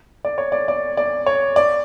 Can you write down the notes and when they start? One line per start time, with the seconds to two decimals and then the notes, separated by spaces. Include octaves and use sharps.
0.25 D5
0.38 C#5
0.52 D5
0.68 D5
0.97 D5
1.26 C#5
1.56 D5